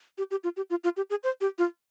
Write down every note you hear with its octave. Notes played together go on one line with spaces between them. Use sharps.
G4
G4
F4
G4
F4
F4
G4
G#4
C5
G4
F4